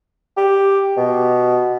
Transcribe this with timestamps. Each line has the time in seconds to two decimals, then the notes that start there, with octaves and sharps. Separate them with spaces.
0.37 G4
0.97 B2